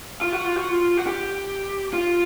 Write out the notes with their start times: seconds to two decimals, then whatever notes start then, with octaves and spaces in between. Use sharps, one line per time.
0.21 F4
0.32 F#4
0.44 F4
0.56 F#4
0.69 F4
0.97 F#4
1.07 G4
1.93 F4